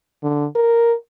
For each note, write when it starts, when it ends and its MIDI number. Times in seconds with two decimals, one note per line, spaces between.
0.23 0.46 50
0.55 0.94 70